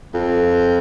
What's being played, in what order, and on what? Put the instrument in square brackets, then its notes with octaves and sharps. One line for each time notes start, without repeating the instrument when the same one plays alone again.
[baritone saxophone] F2